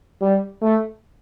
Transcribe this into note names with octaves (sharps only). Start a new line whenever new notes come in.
G3
A3